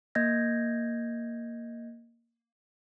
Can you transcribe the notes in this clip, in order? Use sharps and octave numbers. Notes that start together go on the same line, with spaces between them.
A#3 D#5 G6 G#6 A#6